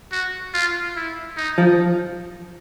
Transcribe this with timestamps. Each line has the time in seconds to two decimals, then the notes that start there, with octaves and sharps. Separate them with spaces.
0.12 F#4
0.54 F4
0.96 E4
1.37 D#4
1.58 F3